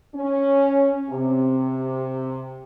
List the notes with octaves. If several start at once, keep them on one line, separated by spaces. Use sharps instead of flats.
C#4
C3